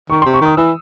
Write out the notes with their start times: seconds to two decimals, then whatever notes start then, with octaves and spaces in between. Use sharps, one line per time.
0.10 D#3 C#6
0.22 C6
0.26 C3
0.33 C#6
0.41 D#3 D#6
0.57 E3 E6